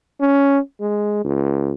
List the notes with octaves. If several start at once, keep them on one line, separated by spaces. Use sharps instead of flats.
C#4
G#3
C#2